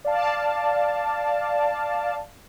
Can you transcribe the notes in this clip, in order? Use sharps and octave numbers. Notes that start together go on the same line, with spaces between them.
D5 F5 A5